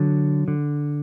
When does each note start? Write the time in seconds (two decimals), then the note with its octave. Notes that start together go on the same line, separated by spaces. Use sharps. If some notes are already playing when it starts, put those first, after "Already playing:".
Already playing: D3 F#3
0.48 D3